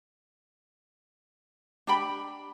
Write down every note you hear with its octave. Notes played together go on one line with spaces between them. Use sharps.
D4 G4 G5 B5